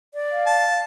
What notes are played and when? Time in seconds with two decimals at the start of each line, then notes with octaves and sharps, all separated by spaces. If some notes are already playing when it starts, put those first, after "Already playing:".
0.14 D5
0.31 F5
0.47 A5